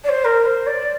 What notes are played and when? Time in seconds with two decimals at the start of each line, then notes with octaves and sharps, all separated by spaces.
0.04 D5
0.09 C5
0.24 A#4
0.45 C5
0.66 D5